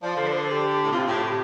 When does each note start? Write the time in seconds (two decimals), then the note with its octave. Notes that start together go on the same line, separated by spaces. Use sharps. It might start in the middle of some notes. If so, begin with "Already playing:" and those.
0.02 F3 D5
0.17 D3 C5
0.27 A4
0.32 C5
0.43 A4
0.51 G4
0.84 A2
0.92 C3 F4
1.07 A2 G4
1.21 G4